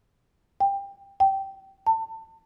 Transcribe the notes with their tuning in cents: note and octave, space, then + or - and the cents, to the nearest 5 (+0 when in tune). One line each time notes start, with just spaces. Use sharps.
G5 +15
G5 -15
A5 +30